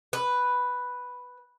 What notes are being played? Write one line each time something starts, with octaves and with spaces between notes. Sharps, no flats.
B4